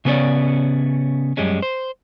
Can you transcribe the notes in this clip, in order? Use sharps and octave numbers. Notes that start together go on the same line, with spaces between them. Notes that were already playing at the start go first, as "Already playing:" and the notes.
C#3 B3 C#4 C#5 D5
F#2 G3 G#3 C#4
C5